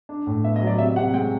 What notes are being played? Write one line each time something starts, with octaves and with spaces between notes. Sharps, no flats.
D4
A2
B3 E5
D#5
F#3
D5
C3 E5
C3 F#5
G#3 G5